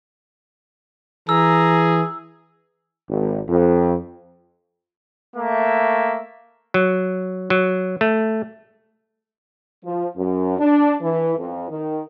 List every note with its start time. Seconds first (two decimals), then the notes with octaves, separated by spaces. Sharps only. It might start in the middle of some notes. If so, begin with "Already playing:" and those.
1.29 E3 G#4 A#5 E6
3.09 G#1
3.48 F2
5.37 A3 A#3 E5
6.74 F#3
7.50 F#3
8.01 A3
9.85 F3
10.16 F#2
10.59 D4
11.01 E3
11.38 F2
11.69 D#3